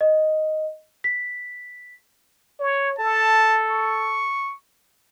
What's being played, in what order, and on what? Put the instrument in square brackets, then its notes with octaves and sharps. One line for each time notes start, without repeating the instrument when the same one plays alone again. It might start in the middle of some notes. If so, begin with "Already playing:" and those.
[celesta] D#5
B6
[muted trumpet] C#5
[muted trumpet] A4 [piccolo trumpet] A5
[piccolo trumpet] C#6